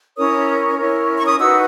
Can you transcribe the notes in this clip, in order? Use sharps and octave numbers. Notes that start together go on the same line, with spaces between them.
C#4 E4 A#4 C#5 D#6
C#4 E4 A#4 C#5
C#6
D#6
D#4 F#4 B4 E6